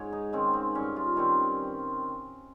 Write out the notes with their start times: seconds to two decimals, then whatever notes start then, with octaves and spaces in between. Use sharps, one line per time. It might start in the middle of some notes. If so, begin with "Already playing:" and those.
Already playing: G#2 C#5
0.13 D#4
0.33 D#3 G#3 C4 C#4
0.53 C4
0.75 G2 C#4
0.96 F4
1.16 D#3 G3 C4 C#4